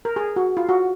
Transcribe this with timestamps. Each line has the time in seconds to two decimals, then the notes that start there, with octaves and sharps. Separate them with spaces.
0.05 A#4
0.16 G#4
0.36 F#4
0.57 F4
0.69 F#4